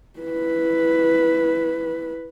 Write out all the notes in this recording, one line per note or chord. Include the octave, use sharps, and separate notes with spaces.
E4 B4